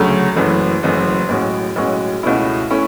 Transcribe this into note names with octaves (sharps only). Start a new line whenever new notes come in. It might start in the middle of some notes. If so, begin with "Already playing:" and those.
Already playing: D2 C#3 F#3 A3
F#1 F#2 E3 A3
F#1 F#2 E3 A3
B1 A2 G#3 C#4 F#4
B1 A2 G#3 C#4 F#4
C#2 B2 A3 C#4 E4
A3 C#4 E4